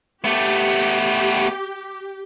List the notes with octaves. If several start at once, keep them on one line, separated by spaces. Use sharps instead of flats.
A3 B3 G4